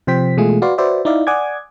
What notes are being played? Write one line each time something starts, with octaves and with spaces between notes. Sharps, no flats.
C3 F3 C5 G5 B6
B2 E3 G#3 A3 F4 G#4
F#4 B4 D5 F5 C6
F#4 B4 C5 D5 E5
D#4 E4 D5 E5 F5
D5 F#5 G#5 D6 D#6 G#6